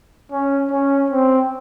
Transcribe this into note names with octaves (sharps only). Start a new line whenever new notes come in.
C#4
C#4
C4